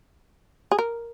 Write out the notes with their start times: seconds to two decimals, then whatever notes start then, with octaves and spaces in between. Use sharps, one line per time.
0.71 G#4
0.79 A#4